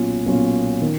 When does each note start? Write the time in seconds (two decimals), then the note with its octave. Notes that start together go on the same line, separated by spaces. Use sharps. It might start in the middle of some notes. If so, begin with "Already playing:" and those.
Already playing: B1 A#2 F#3 C#4 F4
0.26 B1 A#2 F#3 C#4 F4
0.82 D#3